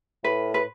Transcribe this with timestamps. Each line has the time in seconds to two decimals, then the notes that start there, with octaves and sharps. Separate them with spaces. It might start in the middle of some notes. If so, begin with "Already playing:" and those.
0.23 A2 B4
0.54 B4